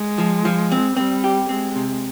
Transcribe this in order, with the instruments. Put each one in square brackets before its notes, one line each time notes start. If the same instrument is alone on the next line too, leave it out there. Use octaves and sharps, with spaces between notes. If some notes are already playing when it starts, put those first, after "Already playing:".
Already playing: [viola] G#3
[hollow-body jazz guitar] F3
F3
C4
[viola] G3 [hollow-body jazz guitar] C4
[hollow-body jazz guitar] G4
[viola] G#3 [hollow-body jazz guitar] C4
[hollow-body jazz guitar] C3